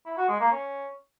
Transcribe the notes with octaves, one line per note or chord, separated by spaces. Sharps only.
E4
F#4
G#3
A#3
C#4